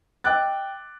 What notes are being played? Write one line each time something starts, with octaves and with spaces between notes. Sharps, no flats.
D#5 G5 D6 E6 F#6 A6